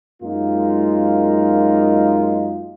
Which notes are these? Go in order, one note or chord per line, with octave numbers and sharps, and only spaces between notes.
F#2 G#3 A#3 D#4 F4